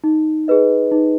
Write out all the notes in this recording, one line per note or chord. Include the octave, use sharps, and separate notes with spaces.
D#4
G#4 B4 D#5
D#4